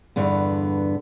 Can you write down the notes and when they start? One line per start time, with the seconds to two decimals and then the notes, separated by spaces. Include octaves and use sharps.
0.16 E2 G2 D3 B3